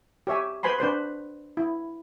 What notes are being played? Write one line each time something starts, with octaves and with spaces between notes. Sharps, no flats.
G4 C#5 E5 G#5
B4 C5 G#5 B5 C6
D4 B4 C5 C6
E4